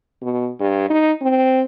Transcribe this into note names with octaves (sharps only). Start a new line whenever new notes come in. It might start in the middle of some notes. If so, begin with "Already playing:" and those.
B2
G2
D#4
C4